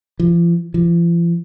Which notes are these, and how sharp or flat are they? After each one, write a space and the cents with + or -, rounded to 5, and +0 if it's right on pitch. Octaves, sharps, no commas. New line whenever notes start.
F3 -40
F3 -45